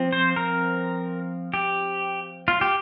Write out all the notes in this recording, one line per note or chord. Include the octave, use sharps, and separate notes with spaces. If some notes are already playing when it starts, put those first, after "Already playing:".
Already playing: F3 C4
C5
A#4
G4
F4
G4